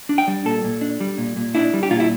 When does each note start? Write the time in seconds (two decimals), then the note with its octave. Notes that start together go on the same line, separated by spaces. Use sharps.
0.09 D4
0.18 G5
0.28 G3
0.45 A#2 A4
0.64 A#2
0.81 D4
1.00 G3
1.18 A#2
1.36 A#2
1.55 D4 E4
1.74 G3
1.83 G4
1.91 A#2 F4
2.00 E4